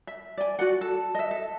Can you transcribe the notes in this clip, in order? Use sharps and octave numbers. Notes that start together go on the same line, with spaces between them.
E5
D5 G#5
F#4 D5 F#5
A4
D#5 E5
A4